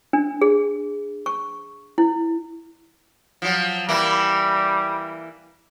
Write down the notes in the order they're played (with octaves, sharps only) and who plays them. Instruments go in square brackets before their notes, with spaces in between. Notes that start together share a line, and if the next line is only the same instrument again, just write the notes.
[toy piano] D4
G#4
C#6
E4
[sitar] F3 F#3
[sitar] E3 A#3 E4 [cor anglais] G3